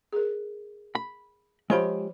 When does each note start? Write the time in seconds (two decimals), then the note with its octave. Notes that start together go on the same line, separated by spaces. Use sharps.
0.13 G#4 A#4
0.95 B5
1.70 F3 G#3 F4 G4 C5 B5